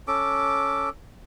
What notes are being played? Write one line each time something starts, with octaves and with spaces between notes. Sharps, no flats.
C#4 A4 D6